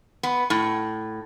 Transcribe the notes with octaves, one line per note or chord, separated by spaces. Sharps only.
B3
A2